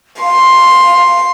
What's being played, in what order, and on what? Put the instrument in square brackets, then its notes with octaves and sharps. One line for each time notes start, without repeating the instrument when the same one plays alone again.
[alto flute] F5 [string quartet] C6